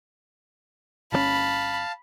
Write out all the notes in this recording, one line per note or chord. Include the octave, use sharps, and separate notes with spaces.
G1 C#3 C#4 F5 A5 B5